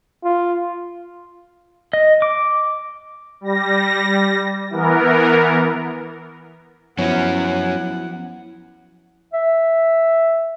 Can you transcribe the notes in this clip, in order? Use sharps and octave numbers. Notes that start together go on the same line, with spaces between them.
F4
D#5
D6
G3 A#6
E3 B3 A#4
F3 F#3 B3 C#4 E4 F#5
E5